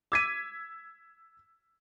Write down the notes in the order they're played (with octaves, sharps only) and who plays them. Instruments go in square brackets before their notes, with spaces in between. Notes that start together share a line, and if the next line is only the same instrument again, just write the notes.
[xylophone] D6 D#7 [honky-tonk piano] E6 G#6 B6